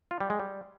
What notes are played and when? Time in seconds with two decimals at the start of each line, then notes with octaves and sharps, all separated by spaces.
0.11 F4
0.20 G3
0.30 G#3
0.40 G3